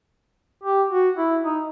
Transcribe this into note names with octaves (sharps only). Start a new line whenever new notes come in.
G4
F#4
E4
D#4